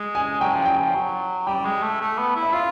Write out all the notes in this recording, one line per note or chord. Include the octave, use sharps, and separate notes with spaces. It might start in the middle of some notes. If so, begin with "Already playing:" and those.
Already playing: G#3
G#5
F#3 G5
F3 G#5
F#3 G5
F3
F#3
G3 G5
G#3
A3
A3
B3
E4
E5
F4 F5